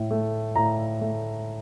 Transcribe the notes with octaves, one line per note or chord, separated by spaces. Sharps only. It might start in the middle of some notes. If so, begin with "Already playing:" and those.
Already playing: A2
A3
A2 A#5
A3